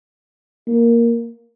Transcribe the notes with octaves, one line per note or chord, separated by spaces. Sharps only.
A#3